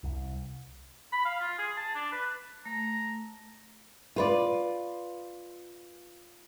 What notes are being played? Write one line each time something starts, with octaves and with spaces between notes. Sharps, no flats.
C2
B5
F5
F4
G#4
A5
D4
B4
A3 A#5
F4 B4 D5